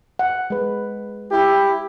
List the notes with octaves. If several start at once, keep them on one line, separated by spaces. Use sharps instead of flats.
F#5
G#3 B4
E4 G4